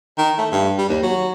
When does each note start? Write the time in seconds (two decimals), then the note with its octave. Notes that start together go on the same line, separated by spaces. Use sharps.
0.18 D#3
0.38 A3
0.52 G2
0.78 G3
0.90 D#2
1.03 F#3